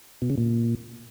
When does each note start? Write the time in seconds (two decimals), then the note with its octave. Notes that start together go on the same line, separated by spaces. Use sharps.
0.22 B2
0.30 C#3
0.38 A#2